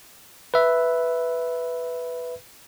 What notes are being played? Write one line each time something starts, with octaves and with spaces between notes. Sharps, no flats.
B4 E5